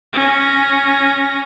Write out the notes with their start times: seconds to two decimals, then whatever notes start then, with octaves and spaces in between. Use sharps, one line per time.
0.13 C#4 A#6